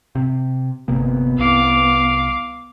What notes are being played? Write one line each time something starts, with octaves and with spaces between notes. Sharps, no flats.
C3
G1 C3 A#3 B3
C2 F5 D6